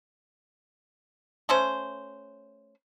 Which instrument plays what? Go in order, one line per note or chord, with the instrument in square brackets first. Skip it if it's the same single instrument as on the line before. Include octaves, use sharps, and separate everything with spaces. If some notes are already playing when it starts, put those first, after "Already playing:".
[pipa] A3 C#4 C5